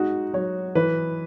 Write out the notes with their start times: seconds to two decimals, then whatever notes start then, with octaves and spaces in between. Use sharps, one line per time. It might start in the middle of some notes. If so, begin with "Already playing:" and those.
Already playing: G#3 D#4 F#4
0.34 F#3 C#5
0.75 E3 B4